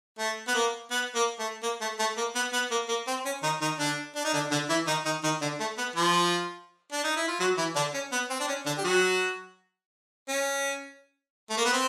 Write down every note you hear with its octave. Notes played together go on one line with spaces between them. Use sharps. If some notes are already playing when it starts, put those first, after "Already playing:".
A3
B3
A#3
B3
A#3
A3
A#3
A3
A3
A#3
B3
B3
A#3
A#3
C4
C#4
D#3 D#4
D#3 D#4
D3 D4
D4
D#4
D3 D4
D3 D4
E3 E4
D#3 D#4
D#3 D#4
D#3 D#4
D3 D4
A3
B3
F3 F4
D4
D#4
E4
F4
F#3 F#4
E3 E4
D3 D4
C#4
B3
C4
D4
C#4
D3 D4
G4
F#3 F#4
C#4
A3
A#3
B3
C4